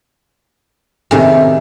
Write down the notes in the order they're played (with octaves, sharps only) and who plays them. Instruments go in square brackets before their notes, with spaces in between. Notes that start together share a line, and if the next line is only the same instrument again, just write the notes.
[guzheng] A2 D#3 G3 [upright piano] C3 G#4